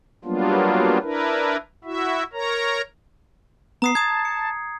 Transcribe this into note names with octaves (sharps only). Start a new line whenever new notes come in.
F#3 G3 A#3 B3 D4 F4
D4 E4 A#4 B4
E4 F#4 E5
A#4 C#5 A#5
B3 A#5 D#6 C7
A5 D#6 G#6
C#7